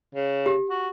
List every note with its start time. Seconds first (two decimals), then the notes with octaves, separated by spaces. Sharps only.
0.15 C#3
0.46 G4
0.70 F#4